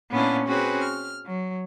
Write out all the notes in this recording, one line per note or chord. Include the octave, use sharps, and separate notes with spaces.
A#2 B3 C#4 D4 E4 F5
C4 C#4 F#4 G#4 B4
F6
F#3